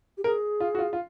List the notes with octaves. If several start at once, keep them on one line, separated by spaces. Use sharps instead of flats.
G4
G#4 A#4
F4
F#4
F4
F4